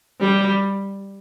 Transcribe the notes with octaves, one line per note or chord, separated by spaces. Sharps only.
G3